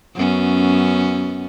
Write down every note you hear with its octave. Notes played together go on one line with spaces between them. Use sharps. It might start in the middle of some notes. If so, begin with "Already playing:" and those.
F#2 B3 C#4